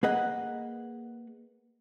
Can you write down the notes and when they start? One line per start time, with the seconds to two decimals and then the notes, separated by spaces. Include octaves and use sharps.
0.03 A#3 G#4 B4 D#5 F#5